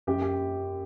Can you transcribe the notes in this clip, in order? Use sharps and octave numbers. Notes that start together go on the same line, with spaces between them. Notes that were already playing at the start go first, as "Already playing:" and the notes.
F#2 G4
G4